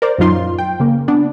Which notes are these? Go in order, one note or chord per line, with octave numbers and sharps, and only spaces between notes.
A#4 C5 D5
F#2 A#2 F#3 D#4 F4 C6
G5
C#3 A#3
B3 D4